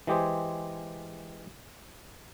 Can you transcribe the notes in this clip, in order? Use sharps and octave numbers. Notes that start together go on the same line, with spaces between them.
E3 G#3 G4 G#4 C5